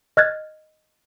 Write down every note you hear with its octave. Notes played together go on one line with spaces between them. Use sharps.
D#5 F6 F#6 G#6 A6